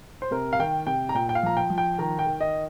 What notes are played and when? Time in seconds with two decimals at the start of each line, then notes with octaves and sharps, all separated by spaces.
0.22 C5
0.31 C3 A#4
0.53 F5
0.59 D#3 G5
0.87 C3 G5
1.09 A#5
1.14 A#2 G5
1.29 G5
1.35 F5
1.43 F3 A#5
1.57 G5
1.70 F3
1.78 G5
1.98 D#3 A#5
2.19 G5
2.26 D#3
2.40 D#5